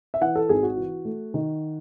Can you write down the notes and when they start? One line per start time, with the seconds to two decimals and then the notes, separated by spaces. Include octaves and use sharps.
0.14 E5
0.21 E3 F#5
0.35 A4
0.49 G#1 G#4
0.63 F#4
0.77 E3
1.05 A3
1.34 D#3